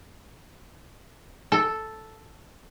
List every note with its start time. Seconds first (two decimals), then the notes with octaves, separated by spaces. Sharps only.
1.52 A4